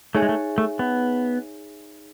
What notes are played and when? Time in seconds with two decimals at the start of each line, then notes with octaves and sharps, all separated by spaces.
0.15 A3 D#4 G#4 C#5 E5 G#5
0.22 G#3
0.29 A3
0.58 A3
0.79 B3